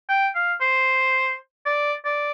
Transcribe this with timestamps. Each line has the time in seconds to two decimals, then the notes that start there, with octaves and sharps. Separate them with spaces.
0.09 G5
0.35 F5
0.61 C5
1.66 D5
2.05 D5